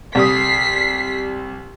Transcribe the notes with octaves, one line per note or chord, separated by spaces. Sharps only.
C2 G3 D#6 B6 C7